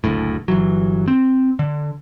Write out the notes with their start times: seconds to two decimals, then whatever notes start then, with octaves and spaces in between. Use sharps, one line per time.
0.04 F#1 D2 A2
0.48 G1 E3 F#3
1.08 C4
1.59 D3